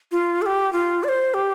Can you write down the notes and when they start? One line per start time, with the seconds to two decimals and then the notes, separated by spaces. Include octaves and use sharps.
0.12 F4
0.42 A4
0.46 G4
0.72 F4
1.04 D5
1.08 C5
1.34 G4